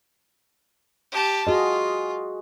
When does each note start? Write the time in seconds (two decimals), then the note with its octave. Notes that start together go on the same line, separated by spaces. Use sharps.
1.12 G4 A5
1.47 F4 F#4 G#4 D#5